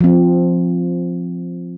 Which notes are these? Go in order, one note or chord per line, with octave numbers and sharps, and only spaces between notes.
F3 C4